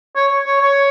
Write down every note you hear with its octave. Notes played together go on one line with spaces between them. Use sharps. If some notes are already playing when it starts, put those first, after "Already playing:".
C#5
C#5
C#5